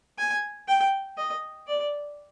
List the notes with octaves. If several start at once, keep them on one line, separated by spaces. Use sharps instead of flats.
G#5
G5
D#5
D5